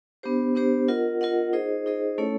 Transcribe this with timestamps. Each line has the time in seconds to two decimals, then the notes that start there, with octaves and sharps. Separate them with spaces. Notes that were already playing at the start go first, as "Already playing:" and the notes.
0.23 B3 D4 G4 C5
0.55 B3 D4 G4 C5
0.88 F4 A#4 D#5 F#5
1.21 F4 A#4 D#5 F#5
1.53 D#4 G#4 C5 D#5
1.86 D#4 G#4 C5 D#5
2.18 A3 C#4 E4 A4 C#5